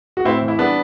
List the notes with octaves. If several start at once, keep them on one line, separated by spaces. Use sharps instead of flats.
F#4
A2 C4 E4
E3
E4
G3 B3 D4